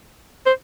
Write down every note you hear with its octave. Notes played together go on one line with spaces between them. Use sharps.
C5